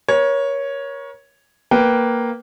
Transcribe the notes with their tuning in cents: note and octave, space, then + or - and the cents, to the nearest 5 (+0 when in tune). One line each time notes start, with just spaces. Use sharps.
A#4 +35 C#5 +0
A#3 +0 B4 +0 G5 -15